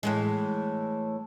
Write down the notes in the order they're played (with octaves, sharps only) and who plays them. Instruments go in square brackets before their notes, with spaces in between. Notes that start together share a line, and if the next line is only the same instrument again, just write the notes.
[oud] A2 E3 G#3